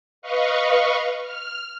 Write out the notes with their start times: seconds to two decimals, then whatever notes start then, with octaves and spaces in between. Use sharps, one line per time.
0.22 B4 D#5 F5 C#6
1.22 F6